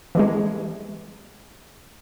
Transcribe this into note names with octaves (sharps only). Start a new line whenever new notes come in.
E3 G3 G#3